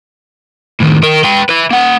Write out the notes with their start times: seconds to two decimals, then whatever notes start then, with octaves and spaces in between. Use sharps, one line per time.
0.80 A2 D#3
1.02 D#3 A#4
1.24 B4 G5
1.49 B4 E5
1.71 A#3 F#5